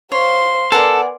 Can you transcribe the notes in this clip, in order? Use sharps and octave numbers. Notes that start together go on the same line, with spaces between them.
C5 C#5 F5 C6
B3 A4 A#4 D5 F#5 G#5